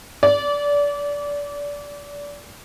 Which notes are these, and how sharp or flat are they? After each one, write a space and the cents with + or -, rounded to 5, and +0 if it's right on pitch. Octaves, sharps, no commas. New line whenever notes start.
D5 -25